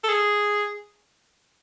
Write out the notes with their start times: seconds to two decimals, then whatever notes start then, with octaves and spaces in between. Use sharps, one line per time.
0.03 A4
0.08 G#4